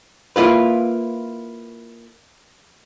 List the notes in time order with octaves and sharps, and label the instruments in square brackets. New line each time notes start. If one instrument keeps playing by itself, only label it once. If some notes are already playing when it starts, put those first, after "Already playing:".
[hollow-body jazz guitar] A#3 E4 F4 B4